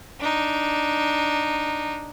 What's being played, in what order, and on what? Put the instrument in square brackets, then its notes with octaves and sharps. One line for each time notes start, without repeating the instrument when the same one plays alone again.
[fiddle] D4 D#4